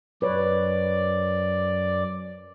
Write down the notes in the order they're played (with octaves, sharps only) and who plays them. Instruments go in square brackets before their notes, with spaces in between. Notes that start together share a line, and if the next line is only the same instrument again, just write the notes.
[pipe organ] F#2 D5 [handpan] B4 C#5